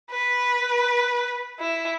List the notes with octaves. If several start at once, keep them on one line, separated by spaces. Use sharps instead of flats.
B4
E4